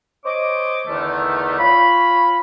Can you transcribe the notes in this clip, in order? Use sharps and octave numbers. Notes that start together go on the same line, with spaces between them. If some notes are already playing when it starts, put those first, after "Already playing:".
C5 C#5 D#5 D6
E2 D3 D#3 A3
F4 C#5 B5